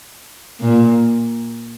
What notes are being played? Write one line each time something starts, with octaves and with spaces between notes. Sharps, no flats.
A#2